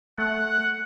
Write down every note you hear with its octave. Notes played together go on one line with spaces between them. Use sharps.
A3 F#5 F#6